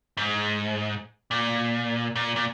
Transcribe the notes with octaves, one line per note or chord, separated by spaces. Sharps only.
G#2
A#2
A#2
A#2